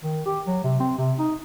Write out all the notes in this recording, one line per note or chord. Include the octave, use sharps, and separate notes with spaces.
D#3
G4
F#3
C3
C4
C3
D#4